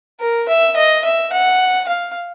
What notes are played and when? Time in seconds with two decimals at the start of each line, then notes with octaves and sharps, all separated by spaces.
0.20 A#4
0.49 E5
0.76 D#5
1.05 E5
1.33 F#5
1.89 F5